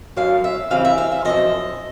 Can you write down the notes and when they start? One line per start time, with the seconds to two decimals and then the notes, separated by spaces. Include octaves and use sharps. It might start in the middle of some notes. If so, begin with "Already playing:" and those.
0.16 F#2 D3 F#3 F5
0.44 E5
0.71 C#3 E3 G3 C4 F5
0.85 E5
0.98 F5
1.12 E5
1.25 C#3 F3 D#5
1.30 F#2